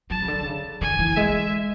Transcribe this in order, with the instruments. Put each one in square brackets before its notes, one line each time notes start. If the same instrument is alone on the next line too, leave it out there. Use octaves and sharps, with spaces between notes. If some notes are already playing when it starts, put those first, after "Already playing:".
[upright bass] F#3 [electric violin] A5
[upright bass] C#3
D3
C#3
[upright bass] D3 [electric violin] G#5
[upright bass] E3
[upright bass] G#3 [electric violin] E5